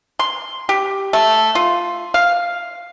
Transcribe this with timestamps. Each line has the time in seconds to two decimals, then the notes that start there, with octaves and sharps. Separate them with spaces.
0.19 C6
0.69 G4
1.13 A3
1.55 F4
2.14 F5